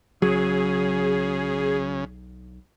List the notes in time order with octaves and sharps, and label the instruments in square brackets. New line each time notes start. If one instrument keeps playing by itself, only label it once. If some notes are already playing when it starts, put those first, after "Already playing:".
[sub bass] B1 [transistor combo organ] C#3 [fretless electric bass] F#3 [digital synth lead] G#4